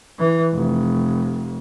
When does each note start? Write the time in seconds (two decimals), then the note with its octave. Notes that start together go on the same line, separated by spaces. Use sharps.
0.19 E3
0.53 F1